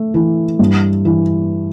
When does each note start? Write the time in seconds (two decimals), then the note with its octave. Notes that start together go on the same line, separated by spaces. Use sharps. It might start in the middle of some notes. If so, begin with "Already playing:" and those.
Already playing: A3
0.14 E3
0.59 G2
1.05 E3